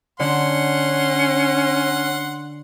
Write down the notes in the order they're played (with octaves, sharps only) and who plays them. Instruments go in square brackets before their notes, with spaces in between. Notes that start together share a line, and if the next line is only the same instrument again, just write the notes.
[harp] D3 [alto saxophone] C#4 [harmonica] F#5 C6